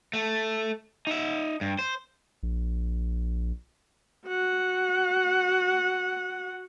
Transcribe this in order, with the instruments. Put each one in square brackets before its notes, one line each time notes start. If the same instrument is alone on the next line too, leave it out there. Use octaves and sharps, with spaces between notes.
[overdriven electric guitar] A3
D#4 E5
G2
C5
[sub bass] A#1
[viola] F#4 F#5